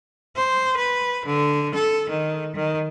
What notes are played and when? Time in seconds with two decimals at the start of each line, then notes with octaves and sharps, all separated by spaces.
0.36 C5
0.77 B4
1.26 D3
1.75 A4
2.10 D#3
2.56 D#3